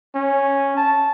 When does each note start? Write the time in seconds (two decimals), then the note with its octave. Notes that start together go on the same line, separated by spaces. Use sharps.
0.15 C#4
0.77 A5